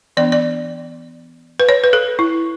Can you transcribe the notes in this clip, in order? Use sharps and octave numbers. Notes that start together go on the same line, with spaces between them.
E3 B3 D4 D5
D5
B4
C#5
B4
A4
E4